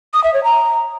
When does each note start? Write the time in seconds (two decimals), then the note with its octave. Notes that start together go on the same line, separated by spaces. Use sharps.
0.14 D#6
0.24 E5
0.34 C#5
0.44 A#5